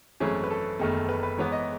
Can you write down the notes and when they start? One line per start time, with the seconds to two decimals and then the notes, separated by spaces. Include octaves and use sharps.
0.20 G#1 F#2 E3 A3 C#4 G#4
0.44 B4
0.51 A4
0.79 F#1 E2 D#3 A3
1.09 B4
1.23 B4
1.37 G#2 E3 B3 C#5
1.52 D#5